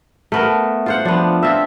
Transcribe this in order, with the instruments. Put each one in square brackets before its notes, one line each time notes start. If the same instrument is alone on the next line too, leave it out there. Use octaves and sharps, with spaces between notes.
[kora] A3 B3 A#4
F4 C5 F#5
[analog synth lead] F3 [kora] B3 D4
[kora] C4 F4 [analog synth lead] E5